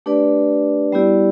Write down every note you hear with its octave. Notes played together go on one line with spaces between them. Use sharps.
A3 D4 G4 B4 D5
G3 B3 E4 G4 D5